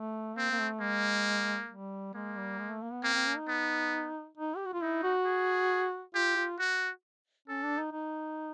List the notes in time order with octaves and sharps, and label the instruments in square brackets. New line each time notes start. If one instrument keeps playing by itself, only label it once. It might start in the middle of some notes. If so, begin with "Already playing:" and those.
Already playing: [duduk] A3
[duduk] A#3 [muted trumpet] C4
[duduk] A#3
A3
[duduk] G#3 [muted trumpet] A#3
[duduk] G3
[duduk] G#3 [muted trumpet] A#3
[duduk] G3
G#3
A3
A#3
B3
[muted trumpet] A#3 [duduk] C4
[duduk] C4
C#4
D#4
[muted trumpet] B3
[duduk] D#4
G4
F#4
F4
[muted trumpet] D#4 [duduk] E4
[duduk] F#4
[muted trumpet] G#4
[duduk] F4 [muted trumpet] G4
[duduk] F4
[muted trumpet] F#4
[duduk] C#4 [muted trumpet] A4
[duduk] D4
D#4
D#4